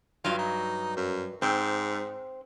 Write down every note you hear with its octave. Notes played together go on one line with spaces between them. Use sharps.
G2 F#3 F4
D#4
F#2
G#2 C4